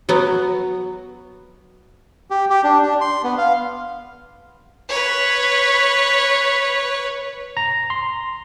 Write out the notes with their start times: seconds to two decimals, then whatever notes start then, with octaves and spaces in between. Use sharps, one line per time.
0.09 F#3 B3 F#4
2.31 G4
2.50 G4
2.64 D4
2.83 D4
3.01 C6
3.24 B3
3.38 F5
4.89 B4 C#5
7.57 A#5
7.90 C6